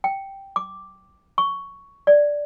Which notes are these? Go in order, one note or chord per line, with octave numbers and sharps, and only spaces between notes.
G5
D6
C#6
D5